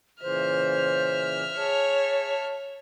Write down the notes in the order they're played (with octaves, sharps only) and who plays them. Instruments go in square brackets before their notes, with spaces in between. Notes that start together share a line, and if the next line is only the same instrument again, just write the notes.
[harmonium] A#2 C#3 E3 [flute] C5 [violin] E5 F6
[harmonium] G#4 [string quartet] C#5 [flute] A5